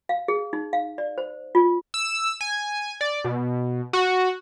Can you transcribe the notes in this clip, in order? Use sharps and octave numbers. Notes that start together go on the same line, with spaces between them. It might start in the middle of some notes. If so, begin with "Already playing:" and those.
F5
G#4
D#4
F5
D5
C5
F4
E6
G#5
D5
B2
F#4